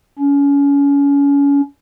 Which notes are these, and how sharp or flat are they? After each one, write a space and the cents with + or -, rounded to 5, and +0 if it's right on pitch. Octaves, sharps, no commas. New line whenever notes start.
C#4 +30